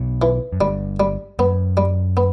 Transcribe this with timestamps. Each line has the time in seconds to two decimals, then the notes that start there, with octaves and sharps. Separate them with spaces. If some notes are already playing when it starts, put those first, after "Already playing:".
Already playing: B1 B2
0.22 E3
0.53 F#2
0.60 G1 G2 G3
1.00 G3
1.39 F#2 B3
1.77 G3
2.17 B3